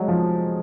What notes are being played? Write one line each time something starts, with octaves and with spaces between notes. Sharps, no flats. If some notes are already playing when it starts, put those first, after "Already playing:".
Already playing: F#3 G#3
F3